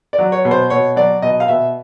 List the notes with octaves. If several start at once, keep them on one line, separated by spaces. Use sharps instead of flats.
D5
F#3
C#5
B2
C5
B2 C#5
F#3 D5
B2 D#5
F5
B2 E5